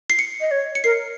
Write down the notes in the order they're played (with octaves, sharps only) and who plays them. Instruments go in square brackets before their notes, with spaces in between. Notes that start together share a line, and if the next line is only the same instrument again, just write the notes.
[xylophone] C7
C#7
[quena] D#5
C#5
[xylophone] C#7
[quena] A#4 [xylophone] C7